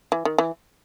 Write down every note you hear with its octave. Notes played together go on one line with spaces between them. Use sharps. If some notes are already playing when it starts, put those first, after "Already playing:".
E3
D#3
E3